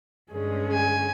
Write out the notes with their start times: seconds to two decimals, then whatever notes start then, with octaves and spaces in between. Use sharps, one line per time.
0.32 G2 D3 G#3 C#4 G#4
0.73 G#5